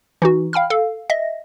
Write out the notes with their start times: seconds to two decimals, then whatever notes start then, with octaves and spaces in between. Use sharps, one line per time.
0.22 E3 D#4 F#4
0.53 F5 G5 B5 F6
0.70 A4 F5
1.10 D#5 E5 A#6